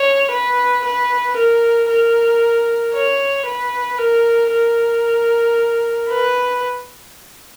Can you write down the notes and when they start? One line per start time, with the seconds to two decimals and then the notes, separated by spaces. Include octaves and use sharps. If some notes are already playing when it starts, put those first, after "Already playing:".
Already playing: C#5
0.30 B4
0.84 B4
1.36 A#4
1.89 A#4
2.94 C#5
3.46 B4
3.99 A#4
4.52 A#4
6.09 B4